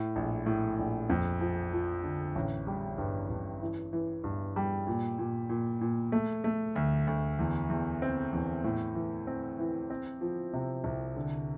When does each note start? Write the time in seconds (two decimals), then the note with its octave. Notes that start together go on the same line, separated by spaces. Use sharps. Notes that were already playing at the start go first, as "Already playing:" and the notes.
Already playing: A2
0.16 A#1
0.46 A2
0.79 A#1
1.10 F2
1.41 F3
1.73 F3
2.03 D3
2.35 A1
2.67 G3
2.98 G2
3.30 G2
3.62 E3
3.93 E3
4.24 G2
4.56 G3
4.87 A#2
5.19 A#2
5.49 A#2
5.81 A#2
6.12 A3
6.44 A3
6.76 D2
7.07 D2
7.39 E2
7.70 E2
8.02 C4
8.33 E2
8.64 A2
8.95 E3
9.27 C4
9.59 E3
9.90 C4
10.21 F3
10.53 C3
10.84 C2
11.16 D3